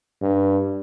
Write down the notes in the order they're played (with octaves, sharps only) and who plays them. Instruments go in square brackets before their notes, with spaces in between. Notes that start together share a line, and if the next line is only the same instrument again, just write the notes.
[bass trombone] G2